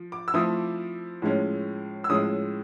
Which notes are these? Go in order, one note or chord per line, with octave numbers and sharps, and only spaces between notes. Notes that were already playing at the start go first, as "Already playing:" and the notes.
Already playing: F3
D6
E6
F3 A3 C4 E4 D#6
A2 F3 G#3 C#4
E6
A2 F3 G#3 C#4 D#6